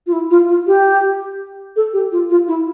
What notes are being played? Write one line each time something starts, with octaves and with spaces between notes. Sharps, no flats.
F4
E4
F4
F4
G4
A4
G4
F4
F4
E4